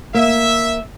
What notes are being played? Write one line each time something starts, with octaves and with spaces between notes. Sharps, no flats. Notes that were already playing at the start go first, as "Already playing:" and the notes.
A#3 E5